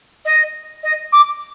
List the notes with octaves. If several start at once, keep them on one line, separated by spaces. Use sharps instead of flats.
D#5
D#5
D6